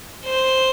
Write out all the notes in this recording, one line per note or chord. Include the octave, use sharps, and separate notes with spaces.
C5